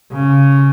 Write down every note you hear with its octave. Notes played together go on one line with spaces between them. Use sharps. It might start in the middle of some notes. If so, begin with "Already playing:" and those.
C#3